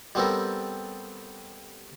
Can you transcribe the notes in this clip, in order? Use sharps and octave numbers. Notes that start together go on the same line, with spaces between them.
G3 B3 C4 G4 A4 A#4